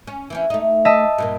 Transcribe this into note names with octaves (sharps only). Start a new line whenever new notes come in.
C#4
E3 C4 C#4
A3 D#4
D#5 E5 A5
G2 A#2 A#3